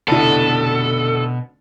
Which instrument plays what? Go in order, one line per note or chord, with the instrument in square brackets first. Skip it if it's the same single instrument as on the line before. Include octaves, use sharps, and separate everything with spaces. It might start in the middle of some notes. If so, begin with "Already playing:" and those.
[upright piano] F1 D3 E4 [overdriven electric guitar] B2 [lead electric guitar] A4